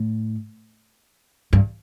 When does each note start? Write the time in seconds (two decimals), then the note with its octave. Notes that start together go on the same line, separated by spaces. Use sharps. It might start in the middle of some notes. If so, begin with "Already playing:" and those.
Already playing: A2
1.53 G2